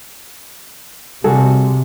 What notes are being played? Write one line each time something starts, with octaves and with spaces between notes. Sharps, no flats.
C3 G3 F#4 G#4 A4